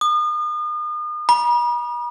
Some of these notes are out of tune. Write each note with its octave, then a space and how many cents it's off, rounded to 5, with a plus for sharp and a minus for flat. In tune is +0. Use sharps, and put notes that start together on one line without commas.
D#6 -40
B5 -45